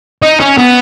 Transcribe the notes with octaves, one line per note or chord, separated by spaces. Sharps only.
D#4
C#4
B3